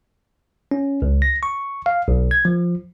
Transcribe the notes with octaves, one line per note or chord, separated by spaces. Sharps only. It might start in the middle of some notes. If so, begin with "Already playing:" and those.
C#4
C#2
A#6
C#6
F5
B1
G#6
F3